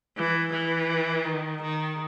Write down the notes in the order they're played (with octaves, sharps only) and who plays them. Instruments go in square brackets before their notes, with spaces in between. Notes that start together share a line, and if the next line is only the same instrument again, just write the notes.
[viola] E3
E3
D#3
D#3